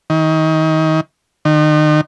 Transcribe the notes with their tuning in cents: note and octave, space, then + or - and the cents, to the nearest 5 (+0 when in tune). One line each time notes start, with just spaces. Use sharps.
D#3 +30
D#3 -35